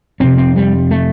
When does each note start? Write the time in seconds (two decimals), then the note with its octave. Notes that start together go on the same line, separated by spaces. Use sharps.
0.20 F1 F2 C3 C4
0.38 C4
0.56 G3
0.91 A3